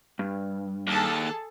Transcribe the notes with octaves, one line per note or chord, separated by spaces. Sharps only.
G2
D#2 G#4 A4 A5